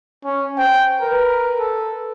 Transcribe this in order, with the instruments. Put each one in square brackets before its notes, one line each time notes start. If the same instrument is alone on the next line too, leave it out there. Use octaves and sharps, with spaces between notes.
[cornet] C#4
[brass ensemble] C5 [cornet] G5
[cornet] A#4 [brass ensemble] B4
[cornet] A4